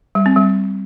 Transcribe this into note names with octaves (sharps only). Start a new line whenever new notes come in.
G3
C4
G3